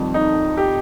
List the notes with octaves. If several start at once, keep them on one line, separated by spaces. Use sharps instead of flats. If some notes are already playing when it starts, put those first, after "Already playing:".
Already playing: F2 D#3 G3
D#4
G4